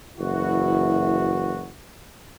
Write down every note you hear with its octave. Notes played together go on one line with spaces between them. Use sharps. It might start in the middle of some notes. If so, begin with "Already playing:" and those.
F#1 E3 E4 F#4